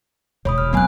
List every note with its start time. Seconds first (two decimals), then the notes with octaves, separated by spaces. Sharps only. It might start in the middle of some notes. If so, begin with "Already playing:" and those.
0.45 E1 C#5 B5 D#6
0.58 F6
0.73 F#3 B3 C4 G#5 F#6